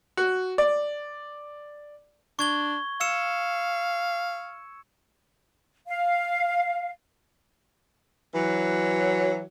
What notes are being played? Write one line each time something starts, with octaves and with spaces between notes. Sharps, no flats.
F#4
D5
D4 C#6 G#6 G7
F5 E6 C#7 E7
F5
E3 F#3